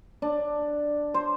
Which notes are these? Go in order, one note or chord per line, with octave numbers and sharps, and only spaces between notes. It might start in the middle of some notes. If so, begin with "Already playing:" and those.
D4
C5